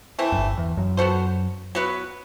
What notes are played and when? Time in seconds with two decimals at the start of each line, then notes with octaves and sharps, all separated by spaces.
0.19 E3 A3 C4 E4
0.32 F#2
0.38 G1 G2
0.58 E2
0.77 F#2
0.97 B3 F#4 A4 C5
1.75 F#3 B3 F#4 B4